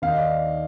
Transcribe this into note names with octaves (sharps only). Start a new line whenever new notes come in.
D#2 D#3 F5
D#5
D5